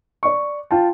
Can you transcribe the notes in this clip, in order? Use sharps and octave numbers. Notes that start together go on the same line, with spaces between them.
D5 C#6
F4 G5 A5